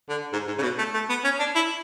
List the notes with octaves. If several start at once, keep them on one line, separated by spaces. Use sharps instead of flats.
D3
G#2
G#2
C#3
B2
A3
A3
B3
C#4
D4
E4